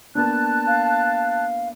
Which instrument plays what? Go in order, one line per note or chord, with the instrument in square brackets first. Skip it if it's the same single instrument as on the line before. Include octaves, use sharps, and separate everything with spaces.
[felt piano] A#3 B3 D4 [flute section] A5 F#6
[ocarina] F5